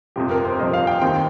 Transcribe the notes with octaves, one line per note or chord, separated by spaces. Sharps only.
G1 F2 C3 F3 G4
A#4
C5
G1 F2 C3 F3 D#5
F5
G5
D#2 D#3 C4 G5